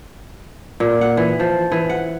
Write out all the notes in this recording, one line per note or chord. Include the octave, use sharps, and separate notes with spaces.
A#2
F#5
E3
F3
E3
F#5